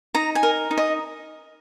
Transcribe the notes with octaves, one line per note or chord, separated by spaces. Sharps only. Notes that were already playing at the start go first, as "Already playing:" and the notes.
D#4 A#5
G#5
A#4
D#4
D#5